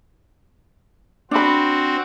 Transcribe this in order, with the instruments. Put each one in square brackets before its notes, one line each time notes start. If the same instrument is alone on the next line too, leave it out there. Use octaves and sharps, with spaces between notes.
[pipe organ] C4 F#4 [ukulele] D4 B5